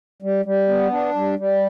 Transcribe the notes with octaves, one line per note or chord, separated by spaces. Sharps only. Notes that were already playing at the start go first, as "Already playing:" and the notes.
G3
G3
B3
D4
G3
G3